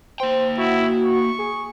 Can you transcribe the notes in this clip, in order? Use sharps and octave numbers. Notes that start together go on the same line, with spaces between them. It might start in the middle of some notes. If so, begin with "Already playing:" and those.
A#3 C5 G5
E4 F#4
C#6
G#4